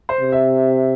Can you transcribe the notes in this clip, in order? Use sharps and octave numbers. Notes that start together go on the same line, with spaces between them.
C5
C3
E5